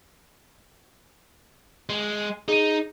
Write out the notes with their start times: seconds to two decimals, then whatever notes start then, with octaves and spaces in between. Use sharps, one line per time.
1.89 G#3
2.48 D#4 G#4 D#7